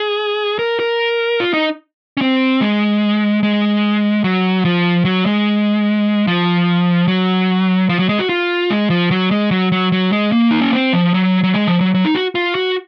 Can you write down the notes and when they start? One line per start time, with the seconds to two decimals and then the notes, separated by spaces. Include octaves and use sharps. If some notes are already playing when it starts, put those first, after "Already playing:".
Already playing: G#4
0.59 A#4
0.80 A#4
1.40 F4
1.54 D#4
2.17 C#4
2.21 C4
2.61 G#3
3.43 G#3
4.24 F#3
4.65 F3
5.05 F#3
5.26 G#3
6.27 F3
7.08 F#3
7.89 F3
7.99 F#3
8.09 G#3
8.19 F#4
8.29 F4
8.70 G#3
8.90 F3
9.11 F#3
9.31 G#3
9.51 F#3
9.72 F#3
9.92 F#3
10.12 G#3
10.32 A#3
10.51 D#4
10.62 C#4
10.73 C4
10.93 F3
11.14 F#3
11.44 F#3
11.54 G#3
11.67 F3
11.81 F#3
11.94 F#3
12.05 D#4
12.15 F#4
12.35 F4
12.55 F#4